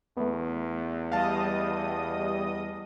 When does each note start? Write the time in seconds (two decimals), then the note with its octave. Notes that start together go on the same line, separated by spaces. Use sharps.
0.17 E2 A3 B3
1.12 G3 D#5 F5 A5 D#6